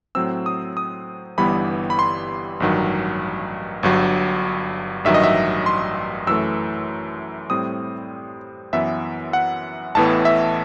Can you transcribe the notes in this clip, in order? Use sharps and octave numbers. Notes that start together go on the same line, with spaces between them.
A2 F#3 C4 E6
D#6
D#6
G1 G2 E3 G3 B3 B5
B5
C6
A1 G2 D#3 F#3
G1 G2 F#3
A1 G2 D#3 F#3 E5
D#5
E5
C6
F#2 E3 A3 E6
A2 G3 C4 D#6
F#2 E3 B3 E5
F#5
A1 A2 E3 B3 A5
E5